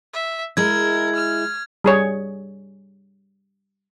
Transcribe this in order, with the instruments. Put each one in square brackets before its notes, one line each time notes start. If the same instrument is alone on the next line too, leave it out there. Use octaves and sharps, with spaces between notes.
[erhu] E5
[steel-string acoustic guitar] G#3 E4 [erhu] A#4 [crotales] G#6
[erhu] F6
[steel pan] G3 G#4 C#5